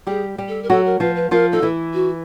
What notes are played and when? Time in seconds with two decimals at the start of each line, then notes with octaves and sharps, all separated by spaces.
0.07 G3 G4 G#4
0.38 G3 G4
0.48 A4
0.63 A#4
0.69 F#3 F#4 A4
0.86 A#4
1.00 F3 F4 B4
1.15 B4
1.31 F3 F4 A#4
1.52 D#4 A4
1.62 E3 E4
1.94 F#4